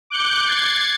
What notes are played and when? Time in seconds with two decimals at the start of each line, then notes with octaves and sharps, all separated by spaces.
0.10 D6 F#6 G6 C#7
0.45 G#6 A6 C7 C#7